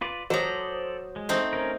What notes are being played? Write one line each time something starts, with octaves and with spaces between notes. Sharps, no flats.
F4 B4 D5
F#3 A4 C5 D5 A#5 D#6
G#3
A3 C4 D#4
C#4 A#4